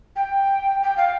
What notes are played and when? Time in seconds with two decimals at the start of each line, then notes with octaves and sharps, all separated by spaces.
0.16 G5
0.83 G5
0.97 F5